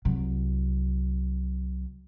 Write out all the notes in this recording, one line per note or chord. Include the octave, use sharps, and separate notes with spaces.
C2 F#3